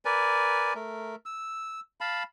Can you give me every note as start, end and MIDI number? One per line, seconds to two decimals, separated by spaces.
0.05 0.74 70
0.05 0.74 71
0.05 0.74 74
0.05 0.74 80
0.75 1.15 57
0.75 1.15 70
1.26 1.80 88
2.01 2.23 77
2.01 2.23 81
2.01 2.23 83